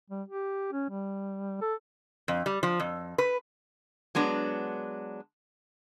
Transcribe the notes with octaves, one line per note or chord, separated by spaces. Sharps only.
G3
G4
C#4
G3
A4
F2
G3
F3
F2
B4
F#3 G#3 B3 D4